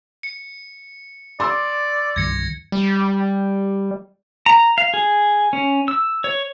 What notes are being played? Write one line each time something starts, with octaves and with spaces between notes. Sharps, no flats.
C#7
D5 C6 D6 E6
C2 G2 D#3 G#6 A#6 C#7
G3
A#5
F5
G#4
C#4
E6
C#5